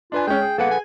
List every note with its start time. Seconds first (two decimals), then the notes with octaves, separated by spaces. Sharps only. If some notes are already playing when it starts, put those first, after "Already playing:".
0.12 D4 F4 B4 G#5
0.27 G#3 C#4 G5
0.41 G#4
0.58 A#3 A4 B4 F#5
0.71 G#5